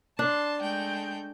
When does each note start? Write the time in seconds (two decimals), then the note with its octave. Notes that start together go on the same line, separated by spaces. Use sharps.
0.19 D4 A5 C6
0.58 G#3 A3 G5